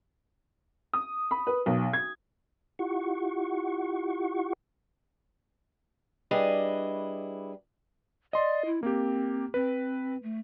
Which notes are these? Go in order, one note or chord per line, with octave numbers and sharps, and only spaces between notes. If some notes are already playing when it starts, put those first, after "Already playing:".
D#6
B5
B4
B1
G#6
E4 F4 G4 F#5 C#6
G3 D4 E4 G#4 B4 D#5
D5 D#5 C6
E4
A#3 C4 G4
C4 B4
A3